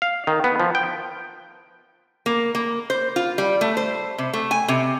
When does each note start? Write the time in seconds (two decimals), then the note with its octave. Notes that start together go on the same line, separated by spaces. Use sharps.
0.02 F5
0.27 D#3
0.44 B3
0.60 F3
0.75 G5
2.26 A#3
2.55 A#3
2.90 C5
3.16 F4
3.38 G3
3.61 A3
3.77 C5
4.18 C3
4.33 A3
4.51 G#5
4.68 C3